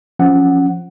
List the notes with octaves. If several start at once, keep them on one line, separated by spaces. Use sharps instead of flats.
F3 C#4 F#5